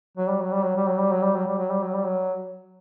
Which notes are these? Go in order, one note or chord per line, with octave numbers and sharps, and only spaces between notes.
F#3
G3
F#3
G3
F#3
G3
F#3
G3
F#3
G3
F#3
G3
F#3
G3
F#3
G3
F#3